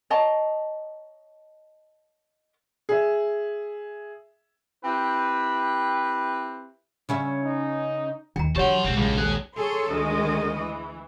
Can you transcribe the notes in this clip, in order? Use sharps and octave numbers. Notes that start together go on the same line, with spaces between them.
C#5 D#5 A5 A#5
G#4 E5
C4 E4 G4 B4
C#3 C#4 E5
D#4
D#2 D#3 G5 A#5
D3 F#3 G4 C#5 F#5 A5 C6
A#1 A#2 G#3 C4
C#2 G2
D#1 C#4 G#4 F#6
G#4 A4 C#5 C6
D2 D#3 G#3 D#5
E3